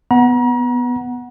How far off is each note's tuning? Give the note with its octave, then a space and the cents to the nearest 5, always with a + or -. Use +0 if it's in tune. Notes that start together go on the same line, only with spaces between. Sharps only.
B3 +0 F#5 +0 A#5 +40